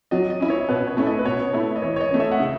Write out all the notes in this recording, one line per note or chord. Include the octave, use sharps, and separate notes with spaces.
F#3 D#5
D#5
C#4 E4
C#5
B2 B4
C#5
A3 C#4 E4
D#5
B4
B2 C#5
A3 E4
D#5
E3 C#5
C#5
D#5
A3 C#4
E5
F#5
C#3